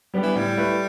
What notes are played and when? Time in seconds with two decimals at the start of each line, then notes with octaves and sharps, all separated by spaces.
0.14 G3 B3 D4 G4
0.23 E3
0.35 A2 G3
0.57 A3 E4 B4